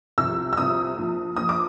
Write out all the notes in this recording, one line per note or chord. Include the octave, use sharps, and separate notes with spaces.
C2 C3 F3 E6
E6
C2 C3 F3 D#6
A#1 A#2 F3
A#1 A#2 F3 D#6
D6